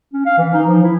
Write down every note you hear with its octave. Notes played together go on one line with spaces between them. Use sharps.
C#4
F5
E3
D#4
F3
E4